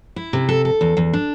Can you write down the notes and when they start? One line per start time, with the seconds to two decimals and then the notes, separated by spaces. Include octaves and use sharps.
0.16 E4
0.33 C3
0.49 A4
0.65 A4
0.81 E2
0.97 E2
1.13 D4